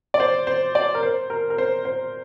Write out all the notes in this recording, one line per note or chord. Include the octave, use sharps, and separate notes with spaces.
D5
C5
C5
D5
A#4
C5
A#4
A#4
C5
C5